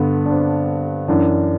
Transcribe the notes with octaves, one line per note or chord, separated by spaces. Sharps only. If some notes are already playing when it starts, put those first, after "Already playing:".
Already playing: G2 D3 B3
D4
C4
F#2 E3 D4